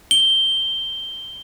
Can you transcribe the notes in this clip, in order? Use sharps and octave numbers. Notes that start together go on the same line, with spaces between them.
G7